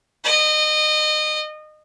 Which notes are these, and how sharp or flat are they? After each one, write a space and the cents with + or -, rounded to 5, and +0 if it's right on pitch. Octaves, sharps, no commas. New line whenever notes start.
D#5 -30